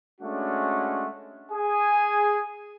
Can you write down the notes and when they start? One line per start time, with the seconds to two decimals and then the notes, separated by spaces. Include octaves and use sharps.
0.21 G#3 A3 C#4 D4 F#4
1.51 G#4 G#5